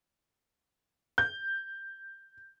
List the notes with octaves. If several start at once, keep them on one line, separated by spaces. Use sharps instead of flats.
G6